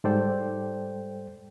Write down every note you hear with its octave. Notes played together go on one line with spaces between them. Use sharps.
G#2 G3 A4 C5 D5 G5